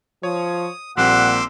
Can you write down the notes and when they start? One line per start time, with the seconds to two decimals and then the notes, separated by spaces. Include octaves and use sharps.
0.23 F3 C#5 D#6
0.97 A#1 A#2 G3 C4 F#5 C6 D6 E6